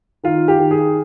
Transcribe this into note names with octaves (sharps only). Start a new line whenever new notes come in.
D#3 F4
G4
D#3
G#4